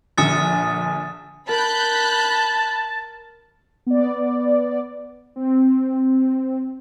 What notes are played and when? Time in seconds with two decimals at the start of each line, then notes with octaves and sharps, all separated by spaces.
0.18 A#1 D3 G#5 D#6 A6
1.49 A#4 A5 B5 F#6 G6
3.86 B3 D5
5.36 C4